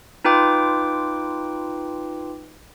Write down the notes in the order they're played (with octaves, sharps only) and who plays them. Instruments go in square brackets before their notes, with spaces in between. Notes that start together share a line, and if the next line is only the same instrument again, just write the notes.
[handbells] D#4 F4 B4 G5 D6